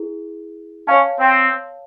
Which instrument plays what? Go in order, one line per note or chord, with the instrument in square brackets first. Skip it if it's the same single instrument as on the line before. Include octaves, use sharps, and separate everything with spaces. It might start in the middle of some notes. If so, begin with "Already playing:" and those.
Already playing: [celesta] E4 G#4
[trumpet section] C#4 [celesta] C#5 F5 A5
[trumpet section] C4